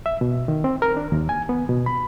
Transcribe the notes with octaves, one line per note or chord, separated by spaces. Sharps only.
E5
B2
D#3
C4
A#4
D4
D#2
G#5
B3
B2
B5